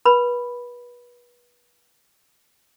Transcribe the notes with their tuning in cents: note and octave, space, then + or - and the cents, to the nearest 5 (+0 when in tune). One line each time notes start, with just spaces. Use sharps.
B4 -30 B5 +0